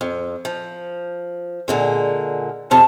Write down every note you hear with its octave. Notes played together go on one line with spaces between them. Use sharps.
F2
F3
A#2 D3 G#3
F2 C3 F5 A5